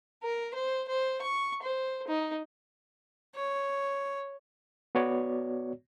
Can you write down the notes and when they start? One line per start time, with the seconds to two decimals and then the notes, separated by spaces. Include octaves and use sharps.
0.23 A#4
0.54 C5
0.88 C5
1.22 C#6
1.63 C5
2.08 D#4
3.35 C#5
4.95 B3 F#4 C#5 D5